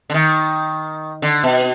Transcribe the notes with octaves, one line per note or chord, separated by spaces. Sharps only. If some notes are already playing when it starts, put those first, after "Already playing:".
D3
D#3
D3
B2